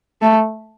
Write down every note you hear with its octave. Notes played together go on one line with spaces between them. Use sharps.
A3